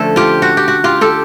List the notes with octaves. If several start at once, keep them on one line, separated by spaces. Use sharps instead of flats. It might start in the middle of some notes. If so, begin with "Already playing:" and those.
Already playing: D3 F3 A3 C#4 A4
F4 G4
F#4
G4
F#4
F4 G4
G4 A4